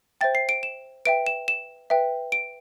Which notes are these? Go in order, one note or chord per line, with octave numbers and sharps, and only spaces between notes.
C5 E5 G5 A6
C7
D7
E7
B4 E5 G5 D7
E7
E7
B4 E5 G5
D7